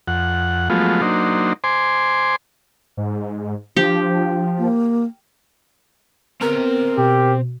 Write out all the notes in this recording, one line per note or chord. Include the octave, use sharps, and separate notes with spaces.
F2 F#5
F3 F#3 G#3 A3 B3 F4
F#3 A#3 D4 D#4 C5
C5 G#5 C6 D6
G#2
F3 D4 G4
A#3
B3 C4 A#4 A#5
B2 G4